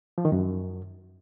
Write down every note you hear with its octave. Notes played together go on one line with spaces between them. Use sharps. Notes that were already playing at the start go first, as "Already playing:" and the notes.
F3
D#3
F#2